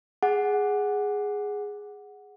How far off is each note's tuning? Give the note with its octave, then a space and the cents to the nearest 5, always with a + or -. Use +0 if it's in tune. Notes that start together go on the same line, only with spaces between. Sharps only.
G#4 -5 F#5 +0